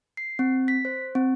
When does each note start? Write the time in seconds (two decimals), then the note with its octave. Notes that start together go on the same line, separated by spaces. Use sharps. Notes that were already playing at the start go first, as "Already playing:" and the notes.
0.17 C7
0.39 C4
0.68 B6
0.85 C5
1.15 C4